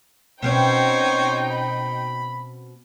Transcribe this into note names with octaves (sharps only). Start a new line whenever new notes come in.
B2 C4 C#4 D#4 C5 C#5 G5
B5